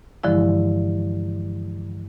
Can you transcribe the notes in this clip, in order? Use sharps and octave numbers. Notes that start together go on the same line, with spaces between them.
G2 D3 E3 F3 G#3 E4